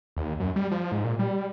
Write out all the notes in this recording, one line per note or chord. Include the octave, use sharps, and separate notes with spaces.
D#2
F#2
G3
F3
G#2
A#2
G3